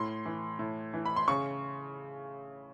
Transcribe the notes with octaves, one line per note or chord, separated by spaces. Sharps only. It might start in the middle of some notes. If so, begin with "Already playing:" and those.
Already playing: A2 C6
E3
A2
E3
B5
C6
C#3 C#6